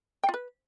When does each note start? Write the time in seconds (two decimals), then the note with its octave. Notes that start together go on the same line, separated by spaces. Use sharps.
0.24 G5
0.29 F4
0.34 B4